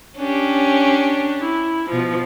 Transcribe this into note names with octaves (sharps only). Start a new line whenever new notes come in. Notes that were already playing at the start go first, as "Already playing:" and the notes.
C#4 D4 G4
E4
B2 F3